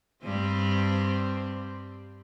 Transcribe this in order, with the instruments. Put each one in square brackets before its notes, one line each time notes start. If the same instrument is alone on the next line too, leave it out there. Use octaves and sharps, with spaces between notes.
[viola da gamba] G2 G3 C4